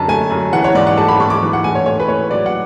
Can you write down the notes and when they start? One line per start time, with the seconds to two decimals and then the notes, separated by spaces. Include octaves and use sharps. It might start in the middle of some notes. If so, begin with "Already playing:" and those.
Already playing: F#2 D3 A5
0.08 A3 G#5
0.31 F#2
0.53 E3 F#5
0.64 C#5
0.75 G#2 D5
0.87 F#5
0.98 A3 A5
1.08 B5
1.20 G#2 C#6
1.30 D6
1.42 E3
1.53 F#5
1.64 A2 G#5
1.75 C#5
1.86 A3 C#5
2.00 B4
2.08 A2 C#5
2.31 F#3 D5
2.46 F#5